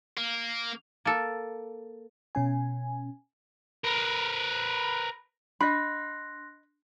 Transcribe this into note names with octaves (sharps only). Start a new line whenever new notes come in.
A#3
A#3 A4
B2 C#4 G#5
A#4 B4
D4 D#5 B5 C6 F#6 A#6